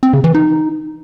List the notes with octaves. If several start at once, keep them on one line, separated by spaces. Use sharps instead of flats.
C4
C#3
E3
D#4